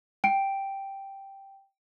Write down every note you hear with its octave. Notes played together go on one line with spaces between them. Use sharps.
G5 D7